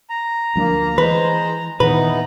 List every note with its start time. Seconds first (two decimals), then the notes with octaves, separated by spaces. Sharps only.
0.10 A#5
0.56 D2 F3 A#3 D4
0.98 E3 G#3 B4 C5
1.80 E2 A#2 D#3 B3 D#4 B4 A#5